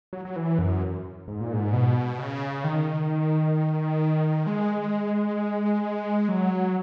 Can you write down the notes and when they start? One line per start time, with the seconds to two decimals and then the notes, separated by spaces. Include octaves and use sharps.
0.13 F#3
0.25 F#3
0.36 E3
0.59 F#2
1.28 G#2
1.41 A#2
1.53 G#2
1.73 B2
2.19 C#3
2.64 D#3
4.47 G#3
6.28 F#3